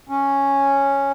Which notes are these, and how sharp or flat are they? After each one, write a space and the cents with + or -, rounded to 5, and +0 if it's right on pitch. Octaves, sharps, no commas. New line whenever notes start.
C#4 -5